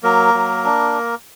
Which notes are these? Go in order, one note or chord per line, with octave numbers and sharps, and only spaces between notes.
F#3 A#3 A#4
F#3
D4